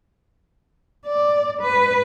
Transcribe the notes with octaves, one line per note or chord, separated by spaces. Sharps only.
D5
B4